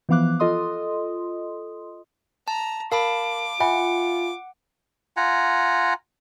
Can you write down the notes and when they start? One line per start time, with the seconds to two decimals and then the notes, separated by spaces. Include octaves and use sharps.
0.09 E3 F3 B3 F5 D6 F#6
0.40 F4 A4 D#5 C6 D#6
2.48 A5 A#5
2.92 A#4 F5 A5 B5 D6
3.60 F4 E5 F#5 G#5 B5
5.17 F4 F#5 G#5 A#5